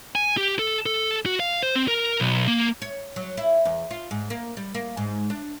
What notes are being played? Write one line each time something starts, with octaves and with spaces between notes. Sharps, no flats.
G#5
G4
A4
A4
F#4
F5
C5
C4
A#4
B1
A#3
C#5
F#3
E4
E2
F4
G#2
A#3
G3
A#3
G#2
D4